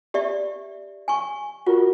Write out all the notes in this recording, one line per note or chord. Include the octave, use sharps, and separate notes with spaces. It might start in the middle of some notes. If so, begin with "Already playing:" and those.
G4 D5 E5
G#5 C#6
F4 F#4 A#4